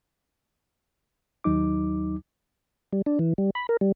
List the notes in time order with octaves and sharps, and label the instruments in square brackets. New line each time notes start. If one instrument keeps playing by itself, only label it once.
[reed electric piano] D#2 F#3 D#4 D6
[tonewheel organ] G3
D4
E3
G3
B5
A#4
G3